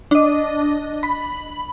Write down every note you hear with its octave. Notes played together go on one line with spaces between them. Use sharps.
D4 D#5
B5